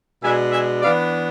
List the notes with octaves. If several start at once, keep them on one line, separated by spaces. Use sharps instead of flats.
B2 G#3 D4 E5 G#5
E5 G#5
E3 B3 D4 D5 F5